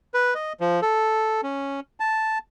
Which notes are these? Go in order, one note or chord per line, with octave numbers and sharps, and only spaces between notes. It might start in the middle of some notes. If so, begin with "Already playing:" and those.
B4
D#5
F3
A4
C#4
A5